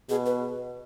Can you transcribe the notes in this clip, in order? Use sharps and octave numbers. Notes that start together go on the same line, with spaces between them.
B2 G#4
B4